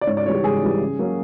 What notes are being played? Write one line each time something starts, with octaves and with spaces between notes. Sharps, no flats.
D5
G#2 C#5
D5
E3 G3 C#5
G4
G#2 G#4
E3 G3
C#3
F#3 A#3 C#4